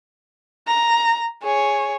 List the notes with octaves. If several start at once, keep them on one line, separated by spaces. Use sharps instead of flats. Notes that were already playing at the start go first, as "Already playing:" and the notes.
A#5
G#4 C#5